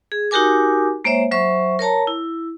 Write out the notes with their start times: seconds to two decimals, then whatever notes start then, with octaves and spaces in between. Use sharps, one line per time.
0.12 G#4
0.31 D#4 F#4 G4 A#4 G#5 D6
1.04 G#3 A#3 C5 C#5 E5
1.31 F#3 C5 E5 C#6
1.79 A#4 C#5 A5 A#5
2.07 E4